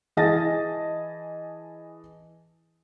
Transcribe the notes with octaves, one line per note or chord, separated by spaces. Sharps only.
E3 G#4 D#5 A5 A6 A#6